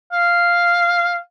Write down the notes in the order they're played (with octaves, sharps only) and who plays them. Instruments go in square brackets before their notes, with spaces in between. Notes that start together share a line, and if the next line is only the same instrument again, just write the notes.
[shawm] F5